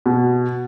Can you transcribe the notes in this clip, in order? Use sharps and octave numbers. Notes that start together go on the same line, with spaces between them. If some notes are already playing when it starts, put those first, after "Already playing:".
B2